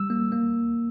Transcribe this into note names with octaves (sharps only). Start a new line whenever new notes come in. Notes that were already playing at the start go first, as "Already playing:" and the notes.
Already playing: G3 E6
A#3
A#3